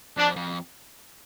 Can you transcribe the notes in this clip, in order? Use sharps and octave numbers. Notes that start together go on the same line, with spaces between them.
F2 D4
F2